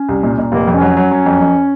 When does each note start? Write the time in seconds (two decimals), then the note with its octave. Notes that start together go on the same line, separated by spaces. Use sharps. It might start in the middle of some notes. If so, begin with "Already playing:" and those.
Already playing: C#4
0.09 C2
0.23 A#2
0.38 A#2
0.52 F1 A#3
0.67 F2
0.74 C#4
0.81 F#3
0.97 F#3
1.11 F#3
1.26 F2
1.40 F2